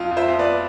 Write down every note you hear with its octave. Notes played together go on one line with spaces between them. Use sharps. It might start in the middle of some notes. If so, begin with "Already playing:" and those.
Already playing: F2 F4
F2
C5 E5
F2
B4 D5